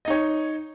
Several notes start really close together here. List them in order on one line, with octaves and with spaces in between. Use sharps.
D#5 D#4 C#5